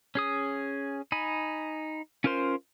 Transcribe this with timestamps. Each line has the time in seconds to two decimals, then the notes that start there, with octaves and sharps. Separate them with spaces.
0.15 C#4 G#4 D#6
1.12 D#4 G#5 B5
2.24 C#4 F4 A#4 C5 C6